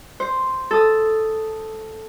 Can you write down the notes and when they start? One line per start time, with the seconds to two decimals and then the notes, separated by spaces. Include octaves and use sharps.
0.20 C5
0.71 A4 D#6